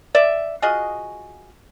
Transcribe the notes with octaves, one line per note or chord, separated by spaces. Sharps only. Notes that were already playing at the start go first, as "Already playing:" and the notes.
D5 E5
F4 F#4 G#4 D#5